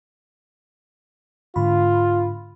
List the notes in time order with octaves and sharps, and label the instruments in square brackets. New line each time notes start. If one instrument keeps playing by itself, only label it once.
[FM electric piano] G#2 D3 B5 [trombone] F4